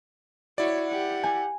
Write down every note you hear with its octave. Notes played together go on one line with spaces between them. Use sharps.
E4 F#4 C#5 D5
G4 F#5
G#5